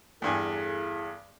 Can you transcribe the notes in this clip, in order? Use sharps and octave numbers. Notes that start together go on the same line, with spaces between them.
E2 G2 E4 G#4 A4 G#5